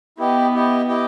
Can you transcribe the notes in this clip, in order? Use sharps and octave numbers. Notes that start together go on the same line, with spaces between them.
B3 E4 G4 D#5 G5
E4 G4 D#5 G5
E4 G4 D#5 G5